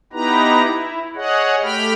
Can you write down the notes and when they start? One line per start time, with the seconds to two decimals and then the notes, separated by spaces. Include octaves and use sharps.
0.13 B3 D#4 E4 G4 B4 A#5
0.63 E4
1.15 G#4 C#5 D#5 F#5
1.63 A3 G4 G5 B5 F6